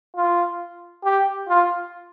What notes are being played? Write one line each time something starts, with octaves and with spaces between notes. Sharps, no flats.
F4
G4
F4